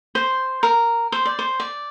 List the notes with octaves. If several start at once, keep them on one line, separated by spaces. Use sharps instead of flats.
C5
A#4
C5
D5
C5
D5